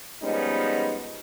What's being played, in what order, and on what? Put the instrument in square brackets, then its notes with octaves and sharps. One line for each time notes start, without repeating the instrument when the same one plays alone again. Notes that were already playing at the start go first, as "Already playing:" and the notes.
[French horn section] F3 G3 G#3 B3 C#4 D#4